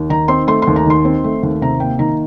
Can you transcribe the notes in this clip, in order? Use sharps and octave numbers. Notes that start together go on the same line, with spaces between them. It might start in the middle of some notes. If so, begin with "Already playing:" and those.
Already playing: D#2
D#3 A#5
C4 C6
A3 C6
C6
D#2
A#5
D#3 C6
C4
A3
D#2
C3 A#5
A#3 G5
D#3 A#5